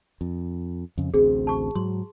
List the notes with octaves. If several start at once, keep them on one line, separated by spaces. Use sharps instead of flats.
F2
F2 C#3
A1 D2 C4 G#4
A5 C#6
G#2 F#3 C6